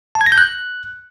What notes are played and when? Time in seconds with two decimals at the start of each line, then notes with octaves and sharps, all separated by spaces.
0.15 A5
0.21 G#6
0.26 A#6
0.32 G6
0.38 F#6